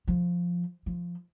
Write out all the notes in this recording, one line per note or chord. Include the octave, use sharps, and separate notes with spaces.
F3
F3